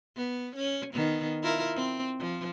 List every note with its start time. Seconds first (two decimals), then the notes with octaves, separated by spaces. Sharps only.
0.17 B3
0.56 C#4
0.94 D#3 B3
1.43 E4 F4 A#4
1.76 C4
2.19 F3